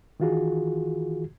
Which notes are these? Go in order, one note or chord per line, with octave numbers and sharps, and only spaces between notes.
D#3 E3 F4 F#4 G#4